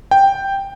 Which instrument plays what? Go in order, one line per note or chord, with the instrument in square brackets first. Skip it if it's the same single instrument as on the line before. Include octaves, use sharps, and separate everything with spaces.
[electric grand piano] G5